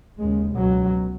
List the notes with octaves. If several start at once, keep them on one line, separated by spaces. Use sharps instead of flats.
D#2 C#3 G#3
C#2 B2 F#3